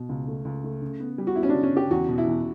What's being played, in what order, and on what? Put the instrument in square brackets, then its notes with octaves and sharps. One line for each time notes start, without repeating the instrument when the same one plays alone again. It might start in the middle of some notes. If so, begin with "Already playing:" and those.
Already playing: [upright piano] B2
C#2
A3
C#2
A3
C#3
B3
G3
[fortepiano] F#4
[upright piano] B3 [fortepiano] E4
[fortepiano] C#4
D4
[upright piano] C#3
[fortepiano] C#4
[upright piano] C#3 [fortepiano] G4
[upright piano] E2 [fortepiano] F#4
[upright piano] B2
[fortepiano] E4
[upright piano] E2